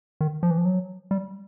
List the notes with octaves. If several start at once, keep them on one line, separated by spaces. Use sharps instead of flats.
D#3
F3
E3
F3
F#3
G3